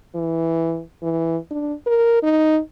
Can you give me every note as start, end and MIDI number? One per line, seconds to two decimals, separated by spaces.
0.15 0.82 52
1.02 1.37 52
1.51 1.73 62
1.86 2.23 70
2.23 2.59 63